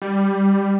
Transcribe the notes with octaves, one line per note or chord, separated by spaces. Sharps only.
G3